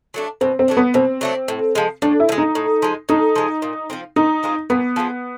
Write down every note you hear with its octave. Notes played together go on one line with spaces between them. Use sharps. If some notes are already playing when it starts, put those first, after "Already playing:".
F#3 A3 D4
B2 C4
C4
F#3 A3 D4
B3
B2 C4
F#3 A3 D4
A2
F3 G#3
A2 D4
E4
F3
G#3
D#4
A2
F3 G#3
A2 D#4
F3 G#3
A#2
F3 G#3 C4
A#2 D#4
F3 G#3 C4
A#2 B3
F3 G#3 C4